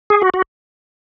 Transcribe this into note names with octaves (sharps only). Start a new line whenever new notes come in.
G#4
F#4
F#4